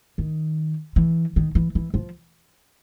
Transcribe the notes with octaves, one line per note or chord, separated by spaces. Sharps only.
D#3
E3
D#3
E3
E3
F3